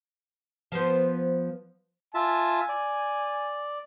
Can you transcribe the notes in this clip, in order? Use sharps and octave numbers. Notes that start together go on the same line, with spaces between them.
F3 B3 C5
F4 E5 G#5 A5
D5